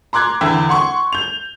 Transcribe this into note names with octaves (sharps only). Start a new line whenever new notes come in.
A#5 C6 D6 F#6 G#6
E2 D3 E4 G5
F#5 C6 C#6
G6 F7